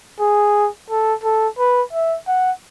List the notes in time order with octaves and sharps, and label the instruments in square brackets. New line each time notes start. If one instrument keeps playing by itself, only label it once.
[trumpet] G#4
A4
A4
B4
E5
F#5